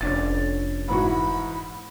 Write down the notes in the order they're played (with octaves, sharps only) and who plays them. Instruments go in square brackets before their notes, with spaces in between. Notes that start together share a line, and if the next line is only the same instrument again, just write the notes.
[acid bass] F1 [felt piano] C#4 D4 A6
[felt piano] G#2 E3 F#4 [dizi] B5